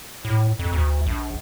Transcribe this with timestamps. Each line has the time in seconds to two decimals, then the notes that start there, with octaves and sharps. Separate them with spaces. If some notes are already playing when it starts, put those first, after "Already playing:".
0.25 A2
0.59 F2
0.73 D2
1.06 A#1